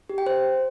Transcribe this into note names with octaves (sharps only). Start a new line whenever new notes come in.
G4
G5
C5